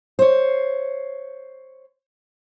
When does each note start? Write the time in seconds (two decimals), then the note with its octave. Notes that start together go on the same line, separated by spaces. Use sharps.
0.19 C5 C#5